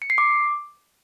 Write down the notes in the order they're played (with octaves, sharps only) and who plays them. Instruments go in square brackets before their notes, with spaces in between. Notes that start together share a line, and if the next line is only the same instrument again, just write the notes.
[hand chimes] C#7
C7
D6